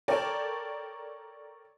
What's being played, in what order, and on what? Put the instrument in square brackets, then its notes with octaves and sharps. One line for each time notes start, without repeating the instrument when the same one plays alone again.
[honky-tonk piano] A4 A#4 C#5 D5 G5 A5